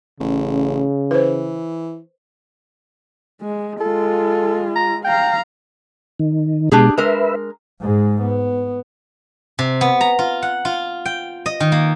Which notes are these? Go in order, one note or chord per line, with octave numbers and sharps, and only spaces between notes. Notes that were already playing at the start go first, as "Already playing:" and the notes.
A1 C#3
E3 B4 C5
G#3
G#3 F4 A4
A#5
F5 G5 A#5
D#3
B2 G#3 D4 G4 G#4
G#3 A#4 B4 E5
G#2 G#3
B3
C3
B3
A#5
F4
F#5
F4
G5
D#5
D#3
A#3